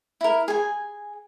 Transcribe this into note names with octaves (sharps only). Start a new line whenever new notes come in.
E4 A#4
G#4 G#5